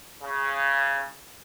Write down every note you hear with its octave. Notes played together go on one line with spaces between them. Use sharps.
C#3